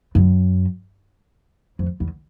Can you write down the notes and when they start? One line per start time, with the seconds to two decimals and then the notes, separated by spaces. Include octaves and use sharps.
0.15 F#2
1.79 F2
2.00 E2